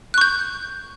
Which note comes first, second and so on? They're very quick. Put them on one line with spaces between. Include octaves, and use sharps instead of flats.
F#6 C#6 G6